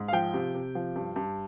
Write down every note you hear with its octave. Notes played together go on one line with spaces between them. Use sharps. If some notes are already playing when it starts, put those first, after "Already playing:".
Already playing: G#2
F5
F3 G5
C3
C3
F3
G2
G2